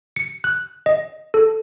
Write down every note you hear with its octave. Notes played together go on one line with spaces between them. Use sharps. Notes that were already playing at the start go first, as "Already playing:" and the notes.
C#7
F#6
D#5
A4